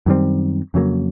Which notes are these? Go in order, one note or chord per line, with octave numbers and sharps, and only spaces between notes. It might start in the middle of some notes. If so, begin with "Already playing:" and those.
F#2 D#3 G3 C4
F2 C#3 F#3 A#3